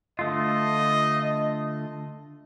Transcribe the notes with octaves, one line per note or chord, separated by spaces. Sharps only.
D3 A3 F4 D#5